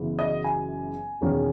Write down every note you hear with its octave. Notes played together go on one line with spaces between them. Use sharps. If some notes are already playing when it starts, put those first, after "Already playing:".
Already playing: F#1 F#2 C#3 E3 B3
D#5
G#5
E1 E2 D#3 A#3 C#4